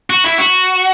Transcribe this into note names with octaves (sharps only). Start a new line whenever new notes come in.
F#4
E4
F#4